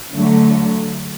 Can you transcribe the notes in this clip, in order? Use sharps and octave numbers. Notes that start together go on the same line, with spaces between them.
D3 F#3 A3